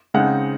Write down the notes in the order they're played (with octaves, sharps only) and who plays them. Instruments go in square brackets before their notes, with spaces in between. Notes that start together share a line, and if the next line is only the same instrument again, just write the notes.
[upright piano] C#3 G#3 C4 D#4 F#5